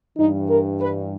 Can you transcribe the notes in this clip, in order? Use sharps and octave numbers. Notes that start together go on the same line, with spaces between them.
G2 E3 D#4
A#4
B4